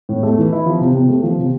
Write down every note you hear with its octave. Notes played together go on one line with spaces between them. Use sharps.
A2
A3
E3
E4
F3
C3
C3
A3
F3
C3